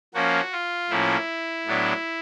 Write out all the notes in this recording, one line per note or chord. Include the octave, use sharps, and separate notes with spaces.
F3 A#3 C#4 F#4
F4
A2 F3 A#3 C#4 E4
A2 F#3 B3 D4